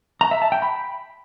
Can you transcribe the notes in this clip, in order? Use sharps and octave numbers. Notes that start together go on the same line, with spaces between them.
A#5
E5
A5
G5
B5